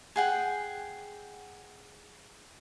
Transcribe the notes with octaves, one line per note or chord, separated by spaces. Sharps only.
G#4 F#5 G5